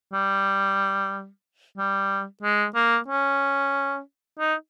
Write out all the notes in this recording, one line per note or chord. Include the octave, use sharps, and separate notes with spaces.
G3
G3
G#3
A#3
C#4
D#4